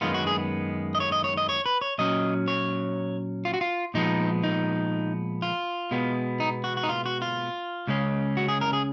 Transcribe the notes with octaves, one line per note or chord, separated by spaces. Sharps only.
F#2 D#3 G#3 B3 F4
F#4
G#4
D#5
C#5
D#5
C#5
D#5
C#5
B4
C#5
A#2 F#3 C#4 D#5
C#5
F4
F#4
F4
A#2 F3 G#3 B3 D#4
D#4
F4
B2 G#3 B3
D#4
F#4
F#4
D#4
F4
F#4
F4
C#2 C#3 G#3 C#4
F#4
G#4
A#4
G#4